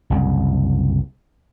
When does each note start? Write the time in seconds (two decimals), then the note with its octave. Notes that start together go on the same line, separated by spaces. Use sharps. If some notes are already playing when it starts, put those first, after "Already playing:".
0.10 F#1 C2